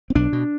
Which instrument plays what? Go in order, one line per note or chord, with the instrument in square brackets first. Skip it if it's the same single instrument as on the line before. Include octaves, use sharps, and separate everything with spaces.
[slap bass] C4
B1 D4
B2